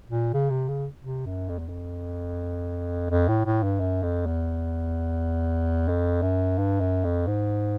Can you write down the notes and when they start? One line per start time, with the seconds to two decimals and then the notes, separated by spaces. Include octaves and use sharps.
0.10 A#2
0.34 C#3
0.50 C3
0.68 C#3
1.03 C3
1.26 F#2
1.49 F2
1.59 E2
1.69 F2
3.10 F2
3.28 A2
3.46 A2
3.63 G2
3.80 F#2
4.03 F2
4.26 E2
5.88 F2
6.22 F#2
6.58 G2
6.81 F#2
7.04 F2
7.27 G#2